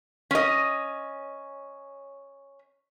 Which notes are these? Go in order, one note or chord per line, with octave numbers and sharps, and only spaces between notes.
C#4 D#5